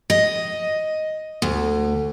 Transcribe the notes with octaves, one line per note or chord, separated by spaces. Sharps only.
D#5
D2